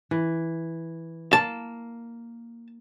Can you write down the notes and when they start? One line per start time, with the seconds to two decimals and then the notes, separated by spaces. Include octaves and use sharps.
0.11 E3
1.33 A#3 A5